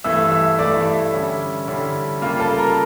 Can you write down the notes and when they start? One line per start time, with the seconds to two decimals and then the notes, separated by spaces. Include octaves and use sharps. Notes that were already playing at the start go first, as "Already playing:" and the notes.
0.04 G2 E3 A3 E5 E6
0.32 E5 E6
0.59 G2 E3 A3 D5 D6
0.77 E4 E5
1.13 D3 G3 C#4 E4
1.68 D3 G3 C#4 E4
2.22 C#3 G3 A#3 F4 F5
2.40 A4 A5
2.58 A#4 A#5